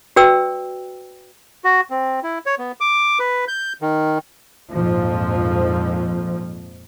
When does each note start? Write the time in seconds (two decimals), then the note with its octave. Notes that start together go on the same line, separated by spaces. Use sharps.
0.16 F#4 B4 D5 G5 E6
1.64 F#4
1.90 C4
2.23 E4
2.46 C#5
2.59 B3
2.81 D6
3.19 B4
3.48 G6
3.82 D#3
4.73 A#1 F2 G#2 F3